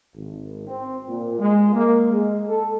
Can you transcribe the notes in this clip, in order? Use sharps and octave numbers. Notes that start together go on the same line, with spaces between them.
G#1
C4
A#2
G#3
A#3
G#3
A4